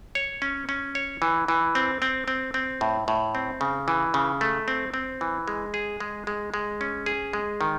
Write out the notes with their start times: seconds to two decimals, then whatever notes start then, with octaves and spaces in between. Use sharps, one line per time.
0.15 C#5
0.42 C#4
0.69 C#4
0.95 C#5
1.22 E3
1.48 E3
1.75 C4
2.02 C4
2.28 C4
2.54 C4
2.81 A2
3.08 A2
3.35 C4
3.61 C#3
3.88 E3
4.14 C#3
4.41 A3
4.68 C4
4.94 C4
5.21 E3
5.48 G#3
5.74 G#4
6.00 G#3
6.27 G#3
6.54 G#3
6.81 C#4
7.06 G#4
7.33 G#3
7.61 D#3